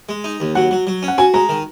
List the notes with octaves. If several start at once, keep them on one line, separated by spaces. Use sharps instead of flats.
G#3
D#4
D#2
F#3 F#5
F#3
F#3
C#4
F#5
F#4 G#5
G#3 A#5
D#3